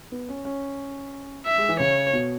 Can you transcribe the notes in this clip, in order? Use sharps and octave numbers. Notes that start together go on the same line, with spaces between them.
B3
C#4
C#4
E5
G#3
E3
C#3 C#5
B2